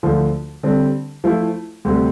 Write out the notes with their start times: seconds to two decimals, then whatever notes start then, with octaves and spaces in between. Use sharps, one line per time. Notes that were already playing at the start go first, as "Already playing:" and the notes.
0.03 D2 D3 F3
0.63 D3 G3 C4
1.24 F3 A3 E4
1.85 D2 C3 G3